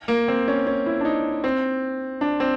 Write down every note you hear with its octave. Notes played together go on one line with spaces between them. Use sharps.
A#3
C4
C#4
C#4
E4
D4
D#4
C4
D4
C4